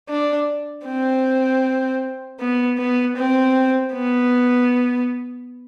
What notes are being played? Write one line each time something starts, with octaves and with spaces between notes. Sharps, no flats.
D4
C4
B3
B3
C4
B3